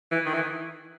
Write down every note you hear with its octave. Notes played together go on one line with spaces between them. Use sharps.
E3
D#3
E3